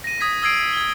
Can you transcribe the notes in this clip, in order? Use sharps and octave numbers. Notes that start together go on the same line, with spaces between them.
A#6 D#7
D#6 G#6 B6
D#6 E6 G#6 C7 D7
G#6 G7